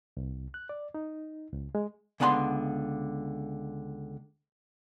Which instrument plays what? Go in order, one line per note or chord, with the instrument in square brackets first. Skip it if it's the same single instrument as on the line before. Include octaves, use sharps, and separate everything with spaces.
[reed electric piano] C2
F#6
D5
D#4
C#2
G#3
[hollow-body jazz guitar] C#2 D3 B3 F#5 A5 C6